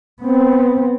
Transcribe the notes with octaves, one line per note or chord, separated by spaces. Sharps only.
B3 C4